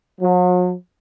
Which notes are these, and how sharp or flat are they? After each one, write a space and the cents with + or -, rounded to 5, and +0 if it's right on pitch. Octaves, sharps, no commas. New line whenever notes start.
F#3 -45